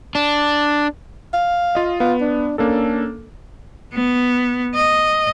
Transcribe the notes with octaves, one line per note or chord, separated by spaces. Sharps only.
D4
F5
F4 D#5
B3 F4
D4
A#3 C#4 D4 A4
B3
D#5